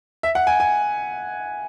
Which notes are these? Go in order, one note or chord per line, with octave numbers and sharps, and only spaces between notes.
E5
F#5
G#5
G#5